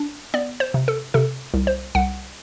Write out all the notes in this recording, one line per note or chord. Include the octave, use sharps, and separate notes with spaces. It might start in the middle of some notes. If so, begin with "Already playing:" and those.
Already playing: D4
B3 D5
C5
C3
A4
C3 A4
C2
C5
C2 F#5